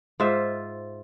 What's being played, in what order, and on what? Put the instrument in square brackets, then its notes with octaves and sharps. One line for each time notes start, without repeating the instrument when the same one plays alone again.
[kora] G#2 F4 C5 E5